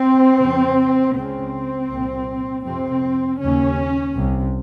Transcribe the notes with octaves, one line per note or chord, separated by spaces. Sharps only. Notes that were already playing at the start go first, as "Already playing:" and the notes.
Already playing: C4
F2 C#3
C#2 C#3 C4
C2 A#2
F2 C3 C4
D#2 C#3 C#4
C2 C3